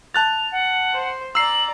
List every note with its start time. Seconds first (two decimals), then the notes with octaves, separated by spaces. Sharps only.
0.14 A5 F#6 A6 F7
0.52 F#5
0.94 C5
1.35 D5 A#5 E6 C7 F#7